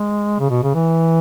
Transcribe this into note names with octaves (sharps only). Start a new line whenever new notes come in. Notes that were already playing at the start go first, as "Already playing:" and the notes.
Already playing: G#3
C#3
B2
C#3
E3